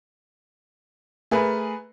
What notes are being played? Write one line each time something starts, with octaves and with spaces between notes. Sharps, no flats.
A3 G#4 A#4 B4